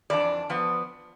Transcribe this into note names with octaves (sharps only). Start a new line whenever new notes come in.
F2 E3 D4 D5
F3 B3